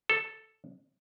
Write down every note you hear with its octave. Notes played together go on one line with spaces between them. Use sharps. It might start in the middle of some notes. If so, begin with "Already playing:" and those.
A4